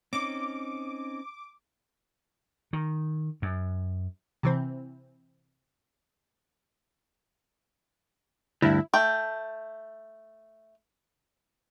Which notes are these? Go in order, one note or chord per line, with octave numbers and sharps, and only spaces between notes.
C4 C#4 D#4 D6
D#3
F#2
C3 E3 C4
D2 G2 E4
A3 G5